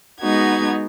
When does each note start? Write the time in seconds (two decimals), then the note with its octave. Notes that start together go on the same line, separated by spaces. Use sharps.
0.20 G#3 B3 D#4 F#4 G#6